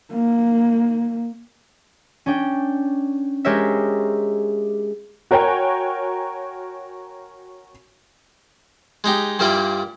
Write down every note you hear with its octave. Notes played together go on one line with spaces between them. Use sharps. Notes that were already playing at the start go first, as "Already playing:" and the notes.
A#3
C#4 D4 G5
G#3 G4 A#4 C5 C#5 E5
F#4 A#4 C#5 G5 G#5
G#3 D#4 G4
G2 A#2 G3 A#3 E4 G5